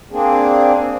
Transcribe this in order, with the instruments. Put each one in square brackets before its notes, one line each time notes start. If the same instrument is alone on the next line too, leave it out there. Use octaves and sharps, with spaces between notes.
[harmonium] A#3 C4 D4 G#4